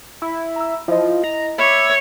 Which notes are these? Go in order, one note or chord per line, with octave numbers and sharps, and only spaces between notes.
E4
A#5 E6
F3 E4 D#5
A#5
C#5 E5 B5 C#6 D6